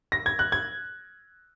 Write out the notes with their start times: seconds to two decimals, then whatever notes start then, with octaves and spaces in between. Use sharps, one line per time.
0.12 A#6
0.26 G#6
0.39 F#6
0.52 G#6